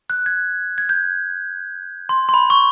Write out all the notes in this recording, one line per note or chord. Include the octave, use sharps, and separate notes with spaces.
F#6
G#6
G#6
G6
C6
C6
B5
C#6